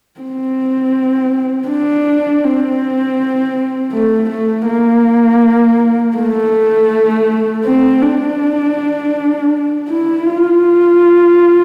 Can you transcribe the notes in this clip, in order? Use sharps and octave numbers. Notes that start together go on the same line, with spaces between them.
C4
D4
C4
A3
A3
A#3
A3
C4
D4
E4
F4